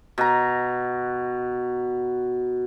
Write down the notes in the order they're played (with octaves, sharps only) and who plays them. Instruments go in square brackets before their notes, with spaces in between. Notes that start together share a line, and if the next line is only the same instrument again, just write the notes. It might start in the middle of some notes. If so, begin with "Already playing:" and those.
[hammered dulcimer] B2 A#5